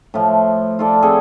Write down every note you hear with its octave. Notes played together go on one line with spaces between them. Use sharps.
A2 F3
F4 A4 D5
C4 G#4 A4